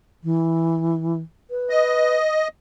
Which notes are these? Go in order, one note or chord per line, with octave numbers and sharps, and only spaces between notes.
E3
B4
D#5